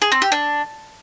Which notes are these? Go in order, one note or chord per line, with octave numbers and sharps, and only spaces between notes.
G#4
C4
G4
D4